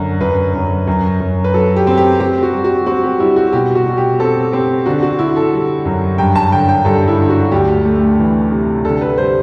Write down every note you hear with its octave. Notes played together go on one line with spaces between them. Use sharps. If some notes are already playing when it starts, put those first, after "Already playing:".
Already playing: F#2 D3
F#2 B4
F#2
F#2
F#2
B4
F#3 A4
G4
C4
G4
C4 G4
F#4
G3
F#4
C4 F#4
G4
G3 E4
F#4
B2 G4
F#4
B2
G4
C4 A4
C4 G4
D3 F#4
F#4
D3 E4
A4
G3
F#2
G2 G5
A5
D3 G5
G5
G2 A4
E4
D3
F#4
D2 G4
A3
E3
C3
D3 A4
B4
G3 C5